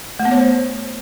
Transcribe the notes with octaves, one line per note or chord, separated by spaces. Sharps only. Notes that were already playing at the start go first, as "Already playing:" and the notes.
A3
B3
C#5
C5